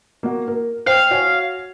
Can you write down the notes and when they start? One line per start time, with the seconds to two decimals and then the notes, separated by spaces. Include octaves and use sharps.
0.23 A#3 F#4
0.48 A#4
0.86 C5 F5 G5
1.11 F#4 C#5 G#5